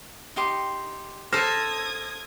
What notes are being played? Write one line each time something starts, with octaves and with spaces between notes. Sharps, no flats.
D#4 G4 C6
A4 C5 D#6 F6 G#6 A#6